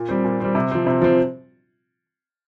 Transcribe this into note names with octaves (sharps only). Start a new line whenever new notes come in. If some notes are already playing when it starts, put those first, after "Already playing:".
Already playing: A#2
G3 C4
A#2
G3 C4
C3
F3 C4
C3
F3 C4